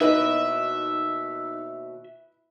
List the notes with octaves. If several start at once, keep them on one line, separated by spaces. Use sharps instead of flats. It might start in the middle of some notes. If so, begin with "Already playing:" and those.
D#2 B2 D#4 E4 F#4 B4 D#5 E5